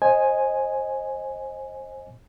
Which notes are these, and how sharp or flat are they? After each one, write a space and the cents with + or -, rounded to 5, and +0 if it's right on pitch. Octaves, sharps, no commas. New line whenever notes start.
C5 +25 D#5 +0 G#5 +0